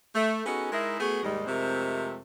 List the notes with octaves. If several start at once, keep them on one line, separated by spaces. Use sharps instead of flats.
A3
B3 C#4 D#4 F#4 G#4 A4
G#3 D#4 E4 G#4 A#4 E5
A3 B3 F#4 G#4
D#2 G#2 G3 G#3
F2 C3 G#3 A3 C4 A#4